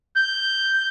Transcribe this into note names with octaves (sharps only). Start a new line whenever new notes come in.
G6